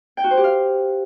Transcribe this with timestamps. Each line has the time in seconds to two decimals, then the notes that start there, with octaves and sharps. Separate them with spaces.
0.17 G5
0.24 F#4
0.31 C5
0.37 G4
0.44 F5